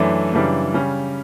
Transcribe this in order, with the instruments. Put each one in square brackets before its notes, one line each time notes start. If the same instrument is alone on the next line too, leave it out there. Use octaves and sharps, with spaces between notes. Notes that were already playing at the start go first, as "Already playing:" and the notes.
Already playing: [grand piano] F#2 E3 A3 D4
F#2 C#3 E3 G3 D4
C#3 G3 C#4